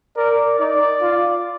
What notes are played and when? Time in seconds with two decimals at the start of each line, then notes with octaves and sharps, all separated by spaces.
0.17 A#4 D5
0.59 D#4 D5
1.02 F4